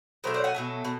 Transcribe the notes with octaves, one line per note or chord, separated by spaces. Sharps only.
B2 F#3 A3 A#4 C5
C5 D5
F#5 G#5
B2 F#3 A3
B2